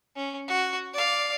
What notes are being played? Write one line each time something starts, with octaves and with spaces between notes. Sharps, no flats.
C#4
F#4
D5 F5